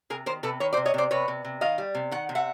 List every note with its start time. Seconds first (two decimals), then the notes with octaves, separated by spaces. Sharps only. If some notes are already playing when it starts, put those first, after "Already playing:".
0.10 C3 G#4 A#4
0.26 D#3 A#4 C5
0.43 C3 A4 B4
0.60 D#3 B4 C#5
0.73 C5 D5
0.77 C3
0.86 C#5 D#5
0.94 C3 C5 D5
1.11 C3 B4 C#5
1.28 C3
1.45 C3
1.61 D#3 D#5 F5
1.78 G3
1.95 C3
2.11 D#3 F#5
2.29 C3
2.35 E5 F#5